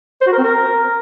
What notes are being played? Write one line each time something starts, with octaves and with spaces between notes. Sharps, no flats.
C5
F#4
A#4
C4
A#4